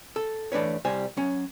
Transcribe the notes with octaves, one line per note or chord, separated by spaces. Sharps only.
A4
E3 A3 D4 B4 C#5
C2 G3 C5 G#5
F#3 C#4